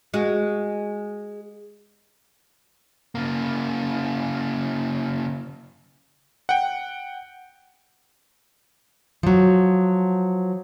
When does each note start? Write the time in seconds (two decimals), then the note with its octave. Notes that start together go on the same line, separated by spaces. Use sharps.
0.14 G#3 F#4
3.15 C#3 A#3
6.49 F#5 G5
9.23 F3 F#3